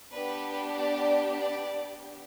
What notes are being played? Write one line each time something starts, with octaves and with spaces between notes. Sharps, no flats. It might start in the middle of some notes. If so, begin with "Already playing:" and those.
B3 D4 G4 B4
D5
D5